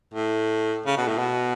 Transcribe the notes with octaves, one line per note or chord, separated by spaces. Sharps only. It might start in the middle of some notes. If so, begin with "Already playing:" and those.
A2
C#3
B2
A2
B2